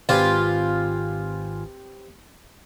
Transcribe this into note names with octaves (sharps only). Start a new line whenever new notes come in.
G#1 C4 F4 G4 B4 G#5